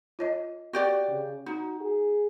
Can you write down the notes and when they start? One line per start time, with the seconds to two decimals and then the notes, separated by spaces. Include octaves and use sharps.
0.19 F4 C#5 D#5
0.73 F#4 G4 D5
1.08 C#3
1.46 D#4 F#4
1.81 G#4